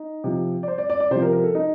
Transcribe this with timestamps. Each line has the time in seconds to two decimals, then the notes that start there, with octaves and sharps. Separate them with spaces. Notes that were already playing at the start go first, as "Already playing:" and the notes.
Already playing: D#4
0.24 C3 F3
0.63 D5
0.68 C5
0.78 D5
0.90 D5
1.00 D5
1.11 C3 C5
1.15 F3
1.22 A#4
1.33 A#4
1.44 A4
1.55 D#4